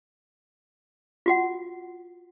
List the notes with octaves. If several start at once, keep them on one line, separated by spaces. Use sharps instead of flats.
F4 F#4 F#5